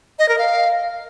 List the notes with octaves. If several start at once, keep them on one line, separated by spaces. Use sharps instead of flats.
D#5
A#4
F5